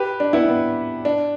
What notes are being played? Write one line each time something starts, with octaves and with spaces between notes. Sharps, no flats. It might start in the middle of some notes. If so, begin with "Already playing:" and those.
Already playing: G4 B4
D4
B3 E4
B3
D4